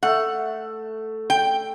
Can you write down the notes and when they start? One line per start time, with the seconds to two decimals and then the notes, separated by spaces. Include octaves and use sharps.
0.03 A3 F#5
1.30 G5